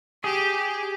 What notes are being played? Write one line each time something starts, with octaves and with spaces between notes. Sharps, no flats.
G4 G#4
G4